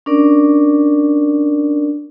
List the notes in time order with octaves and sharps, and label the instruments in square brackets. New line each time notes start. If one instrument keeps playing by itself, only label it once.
[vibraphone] C#4 D4 A#4 D5